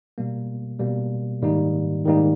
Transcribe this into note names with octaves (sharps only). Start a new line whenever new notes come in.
B2 G3 A#3
B2 G3 A#3
G#2 D#3 G3 A#3 D#4
G#2 D#3 G3 A#3 D#4